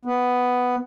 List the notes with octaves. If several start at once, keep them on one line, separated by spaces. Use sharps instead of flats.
B3